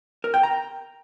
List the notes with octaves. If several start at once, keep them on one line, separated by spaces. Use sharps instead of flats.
A#4
G5
A#5